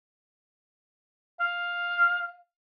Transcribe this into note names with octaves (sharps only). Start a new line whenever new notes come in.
F5